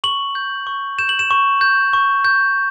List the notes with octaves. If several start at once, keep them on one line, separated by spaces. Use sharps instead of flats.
C#6 F#7
G6
C#6
G6 E7
F#7
E7
C#6
G6
C#6
G6